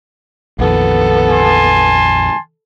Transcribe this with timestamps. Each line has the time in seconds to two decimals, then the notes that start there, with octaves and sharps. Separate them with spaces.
0.59 A#1 F2 D#3 B3 A4
1.31 G#5 A5 C6